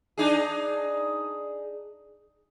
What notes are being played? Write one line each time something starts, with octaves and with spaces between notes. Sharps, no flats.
D4 D#4 G#4